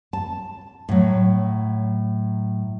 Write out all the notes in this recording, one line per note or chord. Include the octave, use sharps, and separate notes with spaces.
A5
A2 F#3